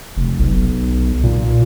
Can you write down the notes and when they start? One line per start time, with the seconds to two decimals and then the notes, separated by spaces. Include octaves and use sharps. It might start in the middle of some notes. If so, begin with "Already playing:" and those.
0.17 F1
0.39 B1
1.23 A#2